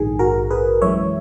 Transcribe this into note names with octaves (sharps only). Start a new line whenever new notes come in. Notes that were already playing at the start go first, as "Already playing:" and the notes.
Already playing: A#1 G#2 D#3 G#4
F#4 A#4
G#4 B4
F#2 E3 G#3 C#5 E5